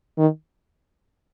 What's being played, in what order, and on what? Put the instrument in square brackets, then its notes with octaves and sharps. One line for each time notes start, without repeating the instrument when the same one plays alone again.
[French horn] D#3